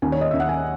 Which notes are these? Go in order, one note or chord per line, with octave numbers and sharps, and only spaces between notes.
D#2 G#5
C#5
D#5
D#2 E5
F#5
G#5